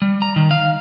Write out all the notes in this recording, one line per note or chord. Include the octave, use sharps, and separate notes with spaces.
G3
A#5
D#3
F5